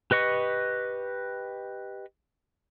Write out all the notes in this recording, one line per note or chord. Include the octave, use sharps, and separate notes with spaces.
G4 B4 D#5 C#6